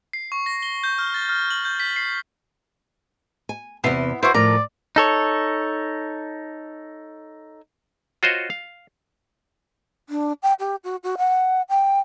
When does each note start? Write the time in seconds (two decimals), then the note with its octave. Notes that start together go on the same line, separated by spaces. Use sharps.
0.13 C7
0.32 C#6
0.46 A#6
0.63 G7
0.84 G6
0.98 F6
1.14 A6
1.29 F6
1.50 F#7
1.65 G6
1.80 B6
1.96 C7
3.49 G#5
3.84 E2 C3 B3 E4 C6
4.23 E4 F#4 B4 C5
4.34 A2 F3 A#4 D5 A#5
4.96 D#4 A4 C#5
8.23 F4 F#4 C5 C#5 D#5
8.50 F5
10.10 D4
10.43 G5
10.59 G4
10.84 F#4
11.04 F#4
11.18 F#5
11.69 G5